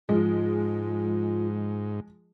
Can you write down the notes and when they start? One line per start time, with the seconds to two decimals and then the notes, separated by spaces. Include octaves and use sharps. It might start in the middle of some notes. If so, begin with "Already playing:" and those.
0.09 G#2 F3 G#3 F4